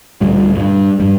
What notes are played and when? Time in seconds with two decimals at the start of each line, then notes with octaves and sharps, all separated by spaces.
0.21 D2 A#2 G3
0.55 G2
1.00 G2 G3